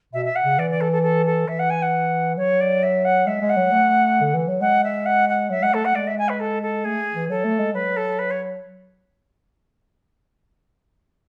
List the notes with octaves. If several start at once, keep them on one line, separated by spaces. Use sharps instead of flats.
B2 E5
E5
F#5
C#3
E3 D5
D5
A4
A4
A4
A4
E3 E5
F#5
G#5
F#5
F#3 C#5
D5
E5
F#5
G#3 E5
G#3
F#5
F#3
A3
D3
E3
F#3
G#3 F#5
E5
F#5
F#5
F#3 E5
G#3 F#5
A3 A4
F#5
G#3 D5
E5
G#5
B4
A4
A4
A3 G#4
E3
F#3 A4
A3
G#3
F#3 B4
A4
B4
C#5